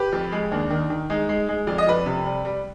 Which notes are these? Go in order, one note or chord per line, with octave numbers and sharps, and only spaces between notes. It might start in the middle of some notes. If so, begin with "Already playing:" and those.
Already playing: G4 B4
F2
G#3
D#2 D4
D#3
D#3
G#3 D#4
G#3
G#3
F2 D5
D#5
F2 B4 D5
C3
G3
G3